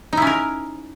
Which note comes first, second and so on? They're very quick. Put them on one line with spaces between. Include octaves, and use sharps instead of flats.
D#4 E4 C#4 A#4